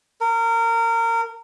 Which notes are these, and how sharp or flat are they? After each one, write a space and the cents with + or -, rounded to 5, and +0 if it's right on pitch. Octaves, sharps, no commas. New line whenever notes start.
A#4 -25